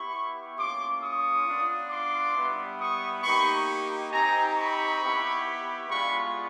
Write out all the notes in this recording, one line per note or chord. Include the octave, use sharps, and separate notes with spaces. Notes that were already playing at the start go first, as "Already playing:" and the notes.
Already playing: B3 E4 G4 B5 C#6
A#3 C#4 F4 C6 D6
C#6 D#6
B3 D4 F4
C6 D6
G3 B3 E4
C#6 D#6
A#3 D#4 G4 B5 C#6
C4 D#4 G4 G#5 A#5
B5 C#6
B3 E4 G4
G#3 B3 D4 F4 B5 C#6